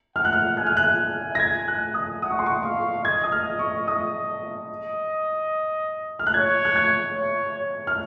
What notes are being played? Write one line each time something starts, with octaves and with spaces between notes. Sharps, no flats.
F#5 F6
F#6
F6
G#5 F#6
F6
F#6
A#6
G#6
F#6
D#6
F#5 D#6
C#6
C6
C#6
F5 C#6
D#5 G#6
D#6
F6
C#6
D#6
D#5
F6
F#6
C#5 G#6
F#6
G#6
C#5
C#5
F6